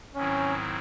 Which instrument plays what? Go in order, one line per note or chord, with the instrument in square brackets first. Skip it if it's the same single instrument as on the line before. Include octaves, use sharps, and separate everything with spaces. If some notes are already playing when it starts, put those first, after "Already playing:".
[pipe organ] G#2 D#3 F#3 C4 E4 [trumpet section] C#4